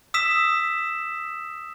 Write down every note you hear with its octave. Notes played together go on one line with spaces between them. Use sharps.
D#6 E6 B6 E7